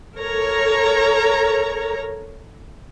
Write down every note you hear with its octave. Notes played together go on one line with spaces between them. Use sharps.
A4 A#4 C#5 A#5